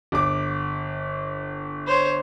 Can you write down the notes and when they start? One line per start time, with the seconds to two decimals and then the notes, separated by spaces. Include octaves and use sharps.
0.12 G1 D6
1.87 C5 C#5